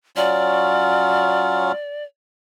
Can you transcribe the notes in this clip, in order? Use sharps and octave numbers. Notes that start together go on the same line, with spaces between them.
F#3 C#4 F4 D5